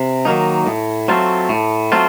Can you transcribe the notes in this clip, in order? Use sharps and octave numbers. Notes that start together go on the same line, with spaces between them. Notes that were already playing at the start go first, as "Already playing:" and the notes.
Already playing: C3
D#3 F#3 A#3 D#4
A2
F#3 A3 C4 F4
A2
F#3 A3 C4 F4